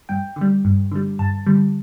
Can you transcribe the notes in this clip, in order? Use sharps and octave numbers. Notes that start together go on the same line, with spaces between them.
G2 G5
D3
G3
G2
D3 G3
G2 A5
D3 G3